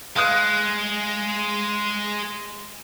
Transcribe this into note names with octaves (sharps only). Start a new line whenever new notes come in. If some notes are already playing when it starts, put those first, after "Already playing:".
G#3 F5 D#6 F#6